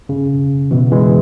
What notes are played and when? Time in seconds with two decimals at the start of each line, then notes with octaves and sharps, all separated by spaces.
0.09 C#3
0.71 B2 E3
0.92 E3 G#3